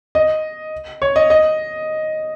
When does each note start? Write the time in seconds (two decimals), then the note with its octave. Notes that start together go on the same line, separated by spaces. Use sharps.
0.15 D#5
1.02 C#5
1.16 D#5
1.30 D#5